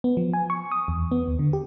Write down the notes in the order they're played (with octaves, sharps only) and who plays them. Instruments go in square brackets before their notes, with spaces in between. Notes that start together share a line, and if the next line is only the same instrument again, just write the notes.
[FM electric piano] B3
F3
G#5
C#6
D#6
E2
B3
D#2
D3
G4